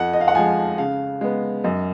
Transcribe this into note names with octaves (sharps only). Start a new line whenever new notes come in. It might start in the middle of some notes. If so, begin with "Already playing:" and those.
Already playing: F2 F#5
D#5
F5
F#5
F3 G#3 G#5
C#3 F5
G#3 B3
F#2 D#5